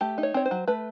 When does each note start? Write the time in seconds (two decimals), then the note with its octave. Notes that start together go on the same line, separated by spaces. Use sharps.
0.01 A3 G4
0.18 D#4
0.23 C#5
0.34 C4 C#5
0.46 C5
0.51 F#3
0.67 A3 B4